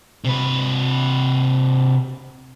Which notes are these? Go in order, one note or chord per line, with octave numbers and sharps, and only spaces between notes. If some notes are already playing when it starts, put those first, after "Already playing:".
C3 B4